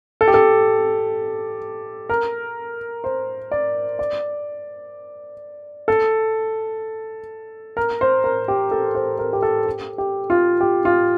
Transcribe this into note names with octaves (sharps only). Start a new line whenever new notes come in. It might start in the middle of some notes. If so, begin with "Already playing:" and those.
A4
G4
A4
A#4
C5
D5
D5
A4
A#4
C5
A#4
G4
A4
C5
A#4
G4
A4
G4
G4
F4
G4
F4